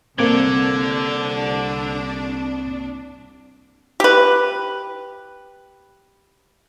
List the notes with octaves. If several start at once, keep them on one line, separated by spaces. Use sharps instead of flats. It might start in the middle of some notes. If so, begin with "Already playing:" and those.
C2 D3 A#3 C4 D4 D6 G#6
G4 B4